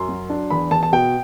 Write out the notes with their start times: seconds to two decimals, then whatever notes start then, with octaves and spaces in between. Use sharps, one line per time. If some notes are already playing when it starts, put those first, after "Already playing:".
Already playing: F#2 C6
0.09 F#3
0.30 D4
0.50 E2 B5
0.71 E2 A5
0.83 A5
0.92 B2 G5